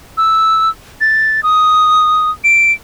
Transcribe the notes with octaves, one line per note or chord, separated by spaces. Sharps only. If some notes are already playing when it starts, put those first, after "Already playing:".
E6
A6
D#6
D7